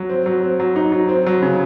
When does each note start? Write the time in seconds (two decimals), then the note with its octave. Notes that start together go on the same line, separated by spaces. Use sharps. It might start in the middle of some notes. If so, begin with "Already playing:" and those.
Already playing: F#3
0.09 C4
0.26 F#3
0.43 C4
0.59 F#3
0.76 D#4
0.92 F#3
1.09 C4
1.26 F#3
1.42 C#3